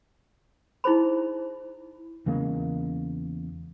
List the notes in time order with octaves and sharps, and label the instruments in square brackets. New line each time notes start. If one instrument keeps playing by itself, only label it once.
[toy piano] D#4 E4 G#4 C5 B5
[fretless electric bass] E2 C#3 G#3 A#3